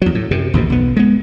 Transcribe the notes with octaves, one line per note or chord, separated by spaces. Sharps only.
E2 F#3
A2
F#2 C3
A1 D#2 G#2 B2
B1 B3
G#3 B3